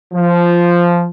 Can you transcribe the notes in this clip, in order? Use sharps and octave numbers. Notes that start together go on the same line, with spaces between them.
F3